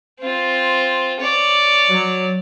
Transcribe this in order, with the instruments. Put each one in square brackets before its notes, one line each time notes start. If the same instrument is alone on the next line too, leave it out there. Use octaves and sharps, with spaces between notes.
[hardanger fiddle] C4 F4
C#5 D5
[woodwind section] F#3